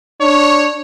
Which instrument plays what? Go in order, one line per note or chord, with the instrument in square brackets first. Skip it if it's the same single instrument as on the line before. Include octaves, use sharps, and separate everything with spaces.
[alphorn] D4 [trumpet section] C#5